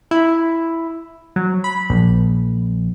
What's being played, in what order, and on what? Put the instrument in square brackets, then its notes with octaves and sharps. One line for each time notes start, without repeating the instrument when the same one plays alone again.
[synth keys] E4
F#3
B5
A#1